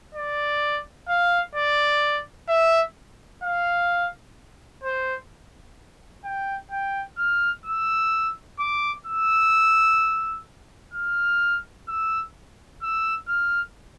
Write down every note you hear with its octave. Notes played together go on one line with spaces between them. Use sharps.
D5
F5
D5
E5
F5
C5
G5
G5
F6
E6
D6
E6
F6
E6
E6
F6